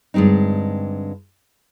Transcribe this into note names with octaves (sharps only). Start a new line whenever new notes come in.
G2 D3 G#3 C4 D#4